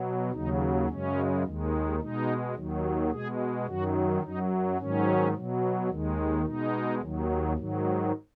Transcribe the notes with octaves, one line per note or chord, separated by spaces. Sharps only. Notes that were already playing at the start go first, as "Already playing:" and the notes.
Already playing: B2 F#3
D#2 C#3 F#3 D#4
F#2 C#3 G#3 C#4
D#2 D#3 G#3
B2 G#3 D#4
D#2 D#3 F#3
B2 G#3 G#4
F#2 D#3 F#3 F#4
F#2 F#3 D#4
G#2 D#3 F#3 C#4
B2 F#3
D#2 D#3 G#3
B2 G#3 D#4
D#2 D#3 F#3
G#2 D#3 F#3